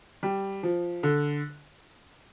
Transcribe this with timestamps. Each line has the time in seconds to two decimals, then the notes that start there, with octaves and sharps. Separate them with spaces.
0.23 G3
0.63 F3
1.03 D3